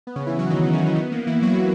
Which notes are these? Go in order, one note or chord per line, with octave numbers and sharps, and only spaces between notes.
B3
C#3 C#4
E3 E4
F#3 F#4
D#3 D#4
C#3 C#4
B3
A#3
E3 E4
F#3 F#4